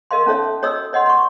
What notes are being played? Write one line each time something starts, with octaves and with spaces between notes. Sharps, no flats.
A#4 D#5 F5 C6
C#4 D#4 A4 C#5 E5
F#4 C#5 D#5 D#6 E6
C#5 D#5 F#5 C6
C6 C#6